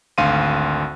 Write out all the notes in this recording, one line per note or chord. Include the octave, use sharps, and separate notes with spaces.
G#1 D2 F5 C6 D#7